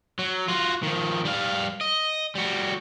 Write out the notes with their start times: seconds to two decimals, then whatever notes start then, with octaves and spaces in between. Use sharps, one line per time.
0.19 F#3
0.48 F4 F#4
0.83 D#3 F3
1.25 G3 F5
1.81 D#5
2.35 G3 F#4